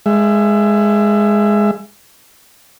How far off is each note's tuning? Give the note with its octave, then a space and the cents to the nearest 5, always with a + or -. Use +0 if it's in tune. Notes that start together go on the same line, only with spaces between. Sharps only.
G#3 +0 E5 +25